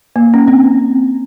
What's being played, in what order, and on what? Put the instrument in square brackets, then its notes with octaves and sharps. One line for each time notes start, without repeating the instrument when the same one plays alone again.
[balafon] A#3
C#4
C4